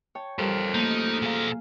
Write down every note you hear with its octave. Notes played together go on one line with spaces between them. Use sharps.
C#5 G5 A5
F3 G3 A4 A#4 C5
A3 A#3 D#4
B2 G#4 F5 A#5